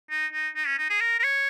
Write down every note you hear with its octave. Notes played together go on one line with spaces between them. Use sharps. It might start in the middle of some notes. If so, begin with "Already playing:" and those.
D#4
D#4
D#4
C#4
D#4
G#4
A#4
A#4
C#5